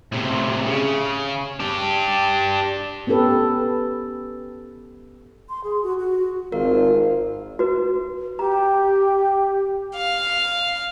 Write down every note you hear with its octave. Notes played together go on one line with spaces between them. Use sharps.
A2 C3
C#3
D4 G4
B3 C#4 G4 A4 B4
C6
G#4
F#4
F#4
G#1 F4 A#4
F#4 B4
G4 A#5
F5